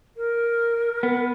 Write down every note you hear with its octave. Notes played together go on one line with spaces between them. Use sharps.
A#4
B3